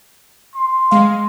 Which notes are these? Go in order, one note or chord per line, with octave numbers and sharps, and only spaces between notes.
C6
G#3 F5